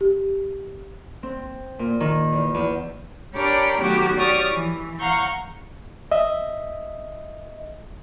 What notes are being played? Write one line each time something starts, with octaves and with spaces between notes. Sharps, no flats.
G4
C4
A#2
D#3
E2
E2
D4 G4 A#4 C#5 G5 B5
D#3 F#3 A3 B3 F#4 G4
G4 C#5 D5 C#6 D#6 F6
E3
F5 F#5 A#5 C#6 G6
D#5 E5